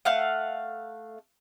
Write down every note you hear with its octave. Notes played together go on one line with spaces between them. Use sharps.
A3 F5 F#5